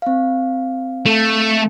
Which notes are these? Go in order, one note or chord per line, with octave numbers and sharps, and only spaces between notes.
C4 F5
A3